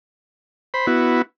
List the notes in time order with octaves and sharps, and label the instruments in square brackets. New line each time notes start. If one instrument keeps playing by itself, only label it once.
[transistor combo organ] C5 B5
B3 E4 F#4